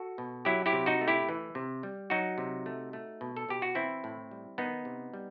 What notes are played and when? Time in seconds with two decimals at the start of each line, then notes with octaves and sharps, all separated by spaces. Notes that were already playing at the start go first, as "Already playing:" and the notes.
Already playing: F#4 A4
0.18 B2
0.45 F#3 E4 G4
0.66 E4 G4
0.73 C3
0.86 D#4 F#4
1.01 A3
1.08 E4 G4
1.29 E3
1.55 C3
1.83 G3
2.10 F#3 D#4 F#4
2.38 C3
2.66 A3
2.93 A3
3.21 B2
3.37 A4
3.49 B2 G4
3.62 F#4
3.75 E3 C4 E4
4.04 A2
4.31 G3
4.58 D#3 B3 D#4
4.85 C3
5.14 G3